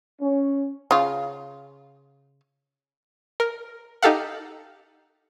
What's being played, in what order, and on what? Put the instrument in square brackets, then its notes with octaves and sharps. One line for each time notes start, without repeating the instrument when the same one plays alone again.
[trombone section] C#4
[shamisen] C#3 F4
[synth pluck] A#4
D#4 G4 A4 F5 F#5